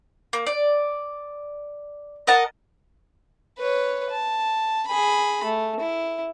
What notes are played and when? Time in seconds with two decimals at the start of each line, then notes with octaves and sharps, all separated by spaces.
0.33 A#3
0.47 D5
2.27 A#4 D#5 F#5 A5
3.59 B4 C#5
4.10 A5
4.87 G#4 B5
5.44 A3
5.80 E4